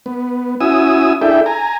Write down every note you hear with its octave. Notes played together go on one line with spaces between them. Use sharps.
B3
C#4 E4 F#4 G#5 D#6 E6
D4 E4 G#4 A4 E5 G5
G#5 A#5